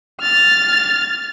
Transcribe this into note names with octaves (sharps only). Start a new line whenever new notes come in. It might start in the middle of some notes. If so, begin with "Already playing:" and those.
F6 A6